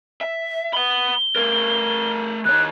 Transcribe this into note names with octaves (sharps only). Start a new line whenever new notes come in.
E5
F#5 B5 G7
A3 A#4
D#3 C#5 F#6